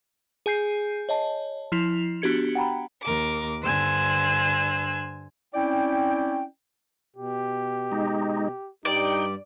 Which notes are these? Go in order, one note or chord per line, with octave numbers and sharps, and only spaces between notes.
G#4 G#5 G6 C7
C#5 D#5 A5
F3 E4 C7 F7
B3 D4 F#4 G4 G#6 C#7
F#5 G5 A#5 B5
D#2 A#4 D6
G2 D3 C5 G#5 E6 F#6
C4 C#4 E4 D5 G5
B2 G4
G#3 D#4
G2 G3 D#4 G4 D5 G5